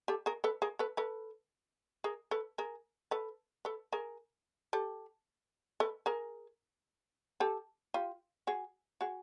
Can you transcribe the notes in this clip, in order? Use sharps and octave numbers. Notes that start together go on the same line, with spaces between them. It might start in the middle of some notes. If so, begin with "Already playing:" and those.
G4 A4
G#4 A#4
A4 B4
G#4 A#4
A4 B4
A4 B4
G#4 A#4
A4 B4
G#4 A#4
A4 B4
A4 B4
G#4 A#4
G4 A4
A4 B4
G#4 A#4
G4 A4
F4 G4
F#4 G#4
F#4 G#4